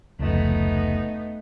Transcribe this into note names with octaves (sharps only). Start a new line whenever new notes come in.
F1 C#2 A3 B3 D#4